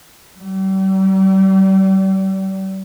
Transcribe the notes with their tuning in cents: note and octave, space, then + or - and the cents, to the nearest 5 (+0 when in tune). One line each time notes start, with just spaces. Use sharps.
G3 -40